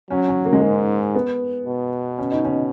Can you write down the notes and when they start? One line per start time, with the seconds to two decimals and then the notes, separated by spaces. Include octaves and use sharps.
0.10 F#3 C#4
0.28 C#4
0.45 A#3
0.53 G#3
0.60 G#2 A#3
1.15 B3
1.66 B2
2.18 C#4
2.32 D#4
2.45 C#4